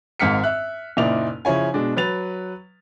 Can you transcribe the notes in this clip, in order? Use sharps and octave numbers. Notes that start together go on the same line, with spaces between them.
G#1 G#2 F5 F6 B6 C#7
E5 F#6
F#1 A#2 D#4 E4 D5 F7
C#3 F3 E4 C#5 G#5
B2 G#3 D4
F#3 B4 A6 F7